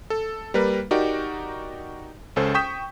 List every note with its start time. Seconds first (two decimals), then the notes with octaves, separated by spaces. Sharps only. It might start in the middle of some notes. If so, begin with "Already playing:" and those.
0.10 A4
0.54 G3 A#3 A#4 B4
0.91 D#4 F#4 G4 A#4 D5
2.36 C#2 C#4 A4 C5
2.54 G5 C#6 D#6 G6 B6 E7